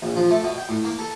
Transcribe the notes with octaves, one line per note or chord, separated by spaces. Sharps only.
A#1
F3
A3
B2
G5
A2
A#3
A4